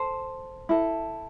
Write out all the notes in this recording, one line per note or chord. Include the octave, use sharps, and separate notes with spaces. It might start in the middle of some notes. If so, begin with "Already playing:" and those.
Already playing: A4 C5
E4 A4